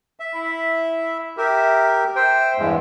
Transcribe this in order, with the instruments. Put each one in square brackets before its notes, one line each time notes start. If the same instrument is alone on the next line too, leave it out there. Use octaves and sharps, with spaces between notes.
[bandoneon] E5
[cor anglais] E4
[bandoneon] G4 A#4 [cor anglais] E5
[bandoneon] C5 G5 [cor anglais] E5
[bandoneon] E2 G2 G#3